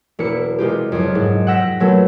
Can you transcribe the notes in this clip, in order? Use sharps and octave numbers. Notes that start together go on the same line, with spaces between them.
E1 A#3 E4 C#7
C3 G#3 F4 G4
F#1 F2
G#2
F#5 G5 E6 A#6 B6
A#2 F#3 A3 B3